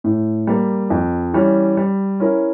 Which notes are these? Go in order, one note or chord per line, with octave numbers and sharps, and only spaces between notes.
A2
G3 A#3
F2
E3 G3 C#4
G3
C#4 E4 A#4